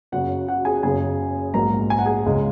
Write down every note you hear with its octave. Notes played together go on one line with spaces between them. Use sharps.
F#1 F#2 C#3 F#4 F#5
F#4 F#5
G#4 G#5
F#1 F#2 C#3 G#4 G#5
A#1 G#2 F#3 A#3 A#4 A#5
G#5
F#5
G#4 G#5
C#2 C#3 G#3